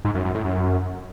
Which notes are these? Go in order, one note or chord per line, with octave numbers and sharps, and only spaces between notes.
G#2
F#2
F#2
A2
F#2